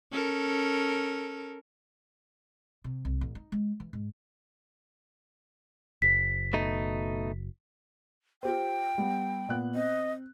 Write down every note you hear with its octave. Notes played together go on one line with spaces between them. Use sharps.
C#4 A4 A#4
C3
C2
A1
D#4
G#3
E3
G#2
F#1 B6
B2 A3 D#4
F4 G4 C5 G5
G3 B3
A#2 B3 F#6
C4 D#5